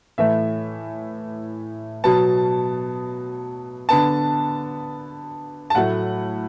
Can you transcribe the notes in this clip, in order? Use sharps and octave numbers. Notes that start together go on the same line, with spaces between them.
A2 E3 A3 E5
B2 F#3 B3 A5
D3 B3 A5
A5
A2 F#3 A3 F#5